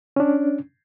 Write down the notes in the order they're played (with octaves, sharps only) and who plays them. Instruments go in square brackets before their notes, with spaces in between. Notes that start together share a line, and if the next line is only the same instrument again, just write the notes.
[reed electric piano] C#4 D4